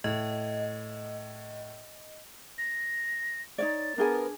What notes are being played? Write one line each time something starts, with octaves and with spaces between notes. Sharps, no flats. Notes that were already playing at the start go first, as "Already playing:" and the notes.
A2 D#5
A#6
D#4 C#5 D5 A6
B3 D4 G#4 A#4 G#5